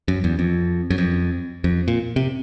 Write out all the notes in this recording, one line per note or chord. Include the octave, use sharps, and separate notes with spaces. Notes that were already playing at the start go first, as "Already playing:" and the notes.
F#2
E2
F2
F#2
F2
F2
A#2
C3